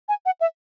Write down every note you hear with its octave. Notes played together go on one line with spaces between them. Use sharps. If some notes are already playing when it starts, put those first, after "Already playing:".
G#5
F#5
E5